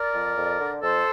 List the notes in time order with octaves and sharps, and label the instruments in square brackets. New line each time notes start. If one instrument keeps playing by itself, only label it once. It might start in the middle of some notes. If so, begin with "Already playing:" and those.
Already playing: [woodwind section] A#4 D5
F2
F2
D3
F2 A4 C5